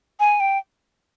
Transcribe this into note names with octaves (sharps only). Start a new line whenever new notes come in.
G#5
G5